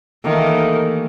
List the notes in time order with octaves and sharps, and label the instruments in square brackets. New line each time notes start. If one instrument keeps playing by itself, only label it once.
[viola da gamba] D#3 E3 [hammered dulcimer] A3 A#3 G4